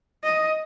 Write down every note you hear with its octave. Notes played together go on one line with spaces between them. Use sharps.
D#5